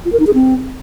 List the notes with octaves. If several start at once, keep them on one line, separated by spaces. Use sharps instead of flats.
F4
A#4
D#4
G#4
C4